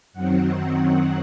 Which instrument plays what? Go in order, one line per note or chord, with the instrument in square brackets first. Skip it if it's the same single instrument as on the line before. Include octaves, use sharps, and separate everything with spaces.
[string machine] F#2 D#3 F#3 C4 F#5